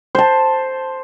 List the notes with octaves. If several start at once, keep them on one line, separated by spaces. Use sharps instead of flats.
C5 A5